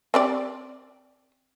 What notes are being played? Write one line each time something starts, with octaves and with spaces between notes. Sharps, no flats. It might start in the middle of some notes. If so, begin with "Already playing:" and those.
C4 G4 D5